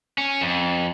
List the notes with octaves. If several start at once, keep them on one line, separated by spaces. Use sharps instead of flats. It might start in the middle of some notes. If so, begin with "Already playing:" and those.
C#4
F2